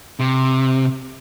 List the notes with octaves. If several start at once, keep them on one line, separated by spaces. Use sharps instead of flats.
C3